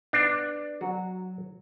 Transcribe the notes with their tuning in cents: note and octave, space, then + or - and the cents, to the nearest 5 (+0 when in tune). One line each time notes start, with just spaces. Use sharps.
B3 +0 D4 +15
F#3 +0 F#4 -15